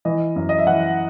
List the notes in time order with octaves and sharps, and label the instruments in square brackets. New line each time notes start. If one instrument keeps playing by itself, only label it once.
[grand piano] E3 D#5
F#2
D#5
E5
E3 F#5